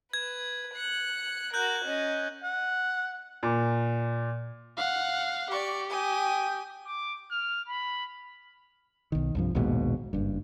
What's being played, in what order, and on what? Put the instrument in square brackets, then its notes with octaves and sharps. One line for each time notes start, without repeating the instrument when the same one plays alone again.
[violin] B4 [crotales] G#6
[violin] F#6 C#7
[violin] F#4 A#4 [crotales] F#6 G6 F#7
[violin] C#4 D#5
[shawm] F#5
[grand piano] A#2
[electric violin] F5 F#5
[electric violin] G4 [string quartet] D5 C#6
[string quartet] G5 G#5 D#6
[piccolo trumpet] D6
F6
B5
[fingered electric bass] B1 D#3
C2 G2 F3
A#1 D#2 G#2 B2
F#1 G2